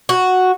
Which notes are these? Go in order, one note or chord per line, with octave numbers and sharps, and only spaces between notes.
F#4